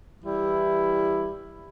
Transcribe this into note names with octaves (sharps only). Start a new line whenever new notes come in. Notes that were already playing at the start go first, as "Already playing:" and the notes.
E3 G3 E4